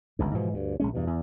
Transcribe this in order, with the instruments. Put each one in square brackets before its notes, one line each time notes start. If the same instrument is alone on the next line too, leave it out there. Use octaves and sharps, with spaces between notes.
[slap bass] G1 C#2 G2
G#2 B2 E3 F3
D2 G2
A#1 G#3 C#4
E2 G2 B2
E2